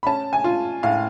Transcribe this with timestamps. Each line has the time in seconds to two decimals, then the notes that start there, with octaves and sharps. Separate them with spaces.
0.03 B5
0.07 C#4 A5
0.33 G#5
0.44 F4
0.83 A2 F5